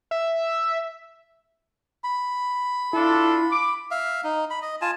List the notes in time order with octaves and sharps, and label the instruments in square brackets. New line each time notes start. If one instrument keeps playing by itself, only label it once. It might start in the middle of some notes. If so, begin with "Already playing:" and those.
[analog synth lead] E5
[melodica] B5
[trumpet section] D4 F4 A4 [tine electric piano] E4
[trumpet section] D6
[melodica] E5 F5
D#4
B5
D#5
F4 G#5 A5